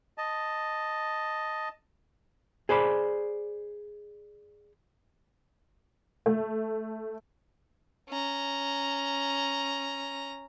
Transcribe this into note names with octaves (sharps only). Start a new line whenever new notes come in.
D#5 A5
G#4 C5 D5 B5
A3
C#4 A#5